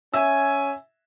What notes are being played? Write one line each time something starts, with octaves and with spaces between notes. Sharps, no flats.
C#4 E5 G#5 E6